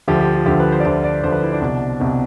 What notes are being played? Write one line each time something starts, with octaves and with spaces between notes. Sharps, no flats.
D2 D3 F3 G4
G4
F4
D2 D3 F3 G4
B4
C5
D5
D2 D3 F3 C5
D5
D2 D3 F3 C5
B4
E4
D4
C2 B2
C2 B2 C4